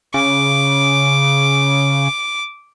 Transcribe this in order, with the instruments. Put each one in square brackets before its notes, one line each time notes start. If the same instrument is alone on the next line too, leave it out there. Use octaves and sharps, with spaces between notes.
[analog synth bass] C#3 [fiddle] D6